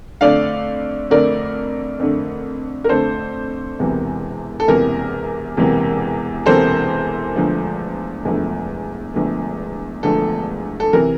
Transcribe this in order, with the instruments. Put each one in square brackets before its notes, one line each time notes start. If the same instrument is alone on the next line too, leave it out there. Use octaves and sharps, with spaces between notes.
[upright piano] F2 D3 A3 D5 F5
F2 D3 A3 A#4 D5
F2 D3 A3
A#4
F2 D3 A3 A4 C5
E1 E2 C3 E3 A#3
A4
E1 E2 C3 E3 A#3 A#4
E1 E2 C3 E3 A#3
E1 E2 C3 E3 A#3 A4 C5
E1 E2 D3 F3 A3
E1 E2 D3 F3 A3
E1 E2 D3 F3 A3
E1 E2 D3 F3 A3 A4
A4
C3 E3 A#4